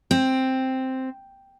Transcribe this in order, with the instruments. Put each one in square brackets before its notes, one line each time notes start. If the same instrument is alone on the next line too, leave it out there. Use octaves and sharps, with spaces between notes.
[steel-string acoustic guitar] C4